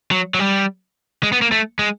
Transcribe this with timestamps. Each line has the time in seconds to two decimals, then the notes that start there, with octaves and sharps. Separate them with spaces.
0.11 F#3
0.34 F#3
0.39 G3
1.23 G#3
1.32 B3
1.42 A#3
1.52 A3
1.79 G#3